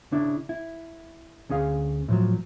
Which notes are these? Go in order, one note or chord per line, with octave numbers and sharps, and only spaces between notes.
C#3 D4 E4
E4
D2 C#4 G#4 F5
A2 F3 F#3